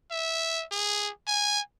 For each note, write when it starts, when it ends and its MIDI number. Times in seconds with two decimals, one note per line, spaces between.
0.11 0.64 76
0.71 1.10 68
1.27 1.60 80